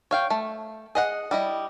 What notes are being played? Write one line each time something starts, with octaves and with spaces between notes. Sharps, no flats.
C#5 F5 G5
A3
G#4 D#5 F#5
G3 E4 D#5